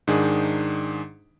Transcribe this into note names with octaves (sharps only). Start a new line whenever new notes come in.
G#2 D#3 D4 D#4 G#4